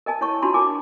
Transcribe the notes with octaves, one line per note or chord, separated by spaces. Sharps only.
A#4 D#5 G#5 A5
E4 C#5 A5 C#6
D4 F4 F#4 A5 B5 C6
A#4 G#5 A5 D6